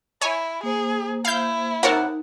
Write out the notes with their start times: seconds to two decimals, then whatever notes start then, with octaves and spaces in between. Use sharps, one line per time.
0.21 E4 C#5 G#5
0.63 A#3 G#4 C5
1.25 E4 F5 G6
1.83 C3 D#4 A#4 C#5 F#5 A5